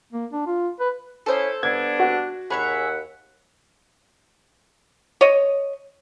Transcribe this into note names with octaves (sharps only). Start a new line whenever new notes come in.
A#3
D4
F4
B4
C#4 E4 A4 C5 D#6
G3 B3 D4 G#6
F#4
D#2 G#4 C#5 E5 F#5 B5
C#5 D#5